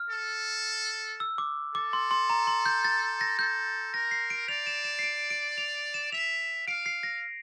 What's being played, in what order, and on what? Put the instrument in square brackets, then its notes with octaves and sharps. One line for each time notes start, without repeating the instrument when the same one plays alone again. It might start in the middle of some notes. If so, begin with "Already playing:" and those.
Already playing: [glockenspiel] F6
[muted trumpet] A4
[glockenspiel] E6
D6
[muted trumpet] A4 [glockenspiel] D6
[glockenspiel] C6
C6
A#5
C6
G6
A6
A#6
[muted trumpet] A4 [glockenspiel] G6
[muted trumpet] A#4 [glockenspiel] A#6
[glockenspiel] C7
D7
[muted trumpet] D5 [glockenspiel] F7
[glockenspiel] E7
E7
C7
D7
D7
F7
E7
[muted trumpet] E5 [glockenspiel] F7
[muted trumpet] F5 [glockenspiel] D7
[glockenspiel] C7
A#6